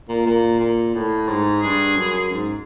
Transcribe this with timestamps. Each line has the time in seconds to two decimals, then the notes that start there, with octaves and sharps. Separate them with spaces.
0.09 A#2
0.26 A#2
0.60 A#2
0.94 A2
1.28 G#2
1.62 G2 G#4
1.96 F#2
2.31 G#2